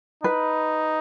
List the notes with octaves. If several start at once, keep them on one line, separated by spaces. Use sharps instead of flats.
D#4 B4